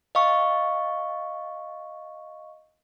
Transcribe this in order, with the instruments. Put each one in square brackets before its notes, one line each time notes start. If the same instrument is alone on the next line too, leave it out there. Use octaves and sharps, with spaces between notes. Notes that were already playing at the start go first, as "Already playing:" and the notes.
[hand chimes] D#5 F5 C#6